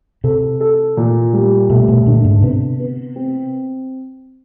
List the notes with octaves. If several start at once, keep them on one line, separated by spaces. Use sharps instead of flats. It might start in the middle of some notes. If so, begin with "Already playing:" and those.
C3 A4
A4
A#2
G3
B2 A3
B2
A#2 D3
G#2
C3 B3
B3
C4